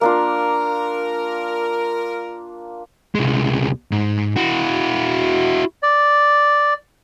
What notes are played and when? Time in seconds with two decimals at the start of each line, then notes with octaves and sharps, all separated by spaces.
0.01 A#3 D4 F4 A#4
3.15 C2 G#3
3.91 G#2
4.36 E4 F#4
5.83 D5